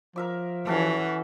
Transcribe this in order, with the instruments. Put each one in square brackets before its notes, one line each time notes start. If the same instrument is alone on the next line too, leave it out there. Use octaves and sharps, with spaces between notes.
[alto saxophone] F3 [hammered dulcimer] A#4 E5 D6
[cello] E3 [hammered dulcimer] C#4 F#4 A4